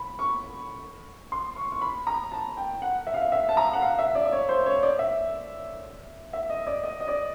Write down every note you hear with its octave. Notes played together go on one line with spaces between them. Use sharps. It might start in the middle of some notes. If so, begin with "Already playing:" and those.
Already playing: B5
C#6
C6
C#6
C#6
B5
A#5
A5
G5
F#5
E5
F5
E5
E5
A5
A#5
F#5
F5
E5
D5
D5
C#5
C5
C#5
D5
E5
E5
D#5
D5
D#5
D#5
D5